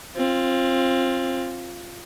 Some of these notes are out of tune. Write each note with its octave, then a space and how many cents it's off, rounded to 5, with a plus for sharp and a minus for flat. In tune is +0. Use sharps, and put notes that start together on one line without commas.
C4 +25 F4 +0